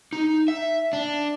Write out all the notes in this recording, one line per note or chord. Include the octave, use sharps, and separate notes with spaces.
D#4
E5
D4